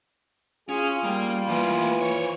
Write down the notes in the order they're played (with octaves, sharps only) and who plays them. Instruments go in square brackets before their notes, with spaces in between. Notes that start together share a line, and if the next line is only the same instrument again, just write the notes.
[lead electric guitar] C#4 [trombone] F4 [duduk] G#4
[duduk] G3 [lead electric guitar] A#3
[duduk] E3 [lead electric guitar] A#3 B3
[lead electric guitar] C5 C#5